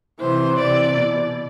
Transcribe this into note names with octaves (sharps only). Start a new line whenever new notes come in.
C3 E3 C5
C3 E3 D5
B2